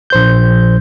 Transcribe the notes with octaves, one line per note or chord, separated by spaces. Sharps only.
A#1 C5 G6